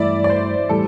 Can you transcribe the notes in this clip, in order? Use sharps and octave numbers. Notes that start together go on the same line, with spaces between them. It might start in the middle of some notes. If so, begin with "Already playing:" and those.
Already playing: G2 E3 A3 E4 D5 E5
D5
C5
A2 E3 G3 A4